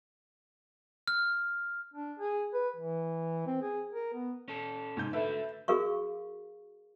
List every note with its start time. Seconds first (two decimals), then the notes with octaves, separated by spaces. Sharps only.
1.07 F6
1.94 D4
2.19 G#4
2.54 B4
2.76 E3
3.46 C4
3.62 G#4
3.93 A#4
4.14 B3
4.48 C#4 A4
4.97 G#2 C3 C#4 G6
5.13 D3 A3 A4 B4 E5
5.68 F#4 G#4 A#4 F5 C#6